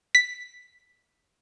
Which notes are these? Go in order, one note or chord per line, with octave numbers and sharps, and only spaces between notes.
B6